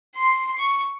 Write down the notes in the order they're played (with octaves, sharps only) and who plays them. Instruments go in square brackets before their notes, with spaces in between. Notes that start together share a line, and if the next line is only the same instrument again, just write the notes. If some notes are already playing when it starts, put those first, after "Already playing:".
[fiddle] C6
C#6